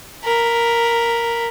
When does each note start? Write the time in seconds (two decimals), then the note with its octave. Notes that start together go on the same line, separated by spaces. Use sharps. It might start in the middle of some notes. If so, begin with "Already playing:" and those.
0.24 A#4 B5